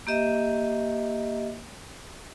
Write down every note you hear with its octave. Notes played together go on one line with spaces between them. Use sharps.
A#3 G4 D#5 E5